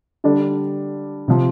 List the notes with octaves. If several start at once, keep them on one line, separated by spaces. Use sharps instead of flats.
D3 G3 D4
C3 F3